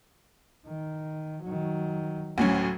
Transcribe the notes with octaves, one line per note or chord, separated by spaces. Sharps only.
D#3
D#3 F#3
D2 A2 F#3 C#4